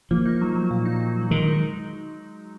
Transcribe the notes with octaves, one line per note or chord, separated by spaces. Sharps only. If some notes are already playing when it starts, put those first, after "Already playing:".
F3 A#3
D#4
F#3
F#3
A#2
D#4
F#3
F#3
D#3 G#3
D#4